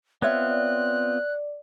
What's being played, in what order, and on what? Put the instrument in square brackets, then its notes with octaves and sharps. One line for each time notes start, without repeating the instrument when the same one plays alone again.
[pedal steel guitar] B3 C4 F4 [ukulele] C#5 E5 [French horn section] D5 [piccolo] F#6